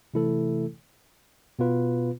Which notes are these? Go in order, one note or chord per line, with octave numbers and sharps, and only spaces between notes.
C3 E3 A3 E4 A4
B2 B3 F4 B4